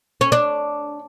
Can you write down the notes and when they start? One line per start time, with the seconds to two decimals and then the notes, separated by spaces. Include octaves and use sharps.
0.21 C#4
0.32 D4